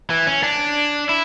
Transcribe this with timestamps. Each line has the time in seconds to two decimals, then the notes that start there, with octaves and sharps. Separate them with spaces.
0.10 E3
0.27 C#4
0.43 D4
1.09 E4